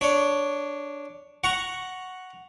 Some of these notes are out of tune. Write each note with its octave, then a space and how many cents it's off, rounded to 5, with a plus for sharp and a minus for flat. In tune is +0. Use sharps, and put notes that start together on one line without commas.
D4 +0 C#5 +10
F#5 +0 A#5 +0 C#6 +0